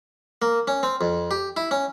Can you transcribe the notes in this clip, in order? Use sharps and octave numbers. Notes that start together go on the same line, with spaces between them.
A#3
C#4
C4
F2
G4
E4
C#4